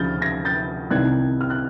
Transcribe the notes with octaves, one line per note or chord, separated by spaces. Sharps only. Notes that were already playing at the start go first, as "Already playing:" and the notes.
Already playing: D2 C#3 F3 F6 G6 A6
G#6 A#6
G6 A6
C2 C3 D#3 G3 F#6 G#6
F6
F#6